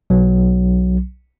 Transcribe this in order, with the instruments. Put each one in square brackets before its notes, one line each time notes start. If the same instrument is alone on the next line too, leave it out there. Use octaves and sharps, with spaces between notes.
[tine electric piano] B1 F#3